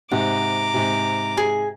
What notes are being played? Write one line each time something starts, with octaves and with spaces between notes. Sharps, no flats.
G#2 C3 F#5 A#5 D6
G#2 C3
G#4 G#5